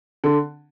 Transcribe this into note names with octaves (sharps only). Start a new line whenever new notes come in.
D3